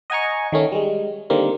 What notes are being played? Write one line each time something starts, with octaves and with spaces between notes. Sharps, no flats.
D#5 F#5 G#5 A#5 C#6
D#3 A3 C#4
G3 G#3
D3 D#3 G3 A#3 C4